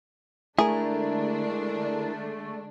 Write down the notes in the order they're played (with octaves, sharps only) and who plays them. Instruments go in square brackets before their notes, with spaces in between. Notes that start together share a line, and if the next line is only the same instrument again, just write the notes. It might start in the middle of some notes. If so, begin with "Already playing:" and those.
[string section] D3 G#3 D4 [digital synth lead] A3 [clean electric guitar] E4 A#4 [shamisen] G#4